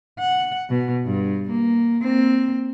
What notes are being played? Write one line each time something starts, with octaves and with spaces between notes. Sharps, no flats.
F#5
B2
G2
A#3
A#3 C4